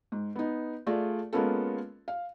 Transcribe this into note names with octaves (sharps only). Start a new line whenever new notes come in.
G#2
B3 D#4
A3 F4 G#4 D5
G#3 A#3 B3 C#4 F4 A4
F5